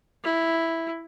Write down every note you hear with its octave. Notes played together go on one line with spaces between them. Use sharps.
E4